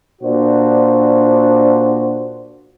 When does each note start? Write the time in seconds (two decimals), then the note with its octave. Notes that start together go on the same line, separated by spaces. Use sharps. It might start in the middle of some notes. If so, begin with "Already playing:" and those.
0.22 A#2 D4 F#4 C5